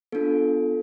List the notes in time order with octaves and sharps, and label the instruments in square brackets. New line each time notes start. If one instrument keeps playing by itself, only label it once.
[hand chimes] B3 D4 F4 A4